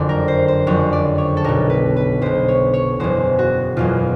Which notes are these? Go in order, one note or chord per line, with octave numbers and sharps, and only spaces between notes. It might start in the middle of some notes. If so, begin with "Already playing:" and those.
Already playing: F#1 F2 D3 D5
A#4
C5
C5
F#1 F2 D3 C#5
D5
C#5
A4
B1 B2 A#4
B4
B4
B1 B2 C5
C#5
C#5
F#1 E2 B2 C5
F#4
F#1 E2 B2 F4